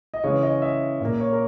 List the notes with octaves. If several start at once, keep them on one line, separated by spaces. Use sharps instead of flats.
D#5
C#3 E3 G#3 C#5
D#5
E5
A#2 A#3
C#5
A#4